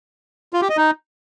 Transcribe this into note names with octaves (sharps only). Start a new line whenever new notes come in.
F4
G4
D#5
D#4